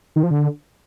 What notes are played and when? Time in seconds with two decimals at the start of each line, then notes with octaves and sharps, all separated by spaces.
0.16 D#3
0.23 F3
0.31 D3